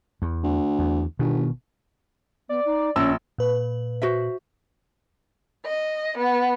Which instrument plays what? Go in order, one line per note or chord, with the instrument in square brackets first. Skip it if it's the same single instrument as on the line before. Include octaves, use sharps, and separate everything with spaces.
[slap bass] E2
[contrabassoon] D2
[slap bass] E2
[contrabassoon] G1 [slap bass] B2 D#3
[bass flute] B3 [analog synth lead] D5
[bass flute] D#4
[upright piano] A#1 E6 [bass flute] C#4
[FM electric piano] A#2 B4
[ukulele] F#4 C5 E5
[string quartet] D#5
B3